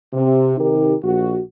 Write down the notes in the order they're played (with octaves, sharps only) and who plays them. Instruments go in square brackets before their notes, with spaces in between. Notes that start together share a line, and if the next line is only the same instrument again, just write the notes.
[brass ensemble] C3
C3 D#3 D#4 G4 A#4
A#1 F#4